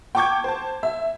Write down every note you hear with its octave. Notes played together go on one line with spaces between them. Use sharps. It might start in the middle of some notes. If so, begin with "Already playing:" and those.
G5 A5 C#6 D6 G6 G#6
C5 A5
E5